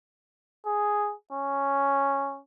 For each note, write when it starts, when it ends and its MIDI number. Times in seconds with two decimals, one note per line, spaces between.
0.66 1.14 68
1.33 2.40 61